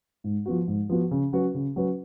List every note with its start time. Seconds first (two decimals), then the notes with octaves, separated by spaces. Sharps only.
0.24 G#2
0.46 F3 B3 F#4
0.68 G#2
0.90 F3 B3 F#4
1.11 C#3
1.33 F#3 C#4 F#4 B4
1.55 C#3
1.76 F#3 C#4 F#4 B4